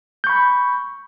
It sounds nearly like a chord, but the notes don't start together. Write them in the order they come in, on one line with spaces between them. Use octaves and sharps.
G6 C#6 B5